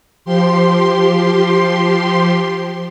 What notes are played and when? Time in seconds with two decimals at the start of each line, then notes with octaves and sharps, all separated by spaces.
0.25 F3 G4 C6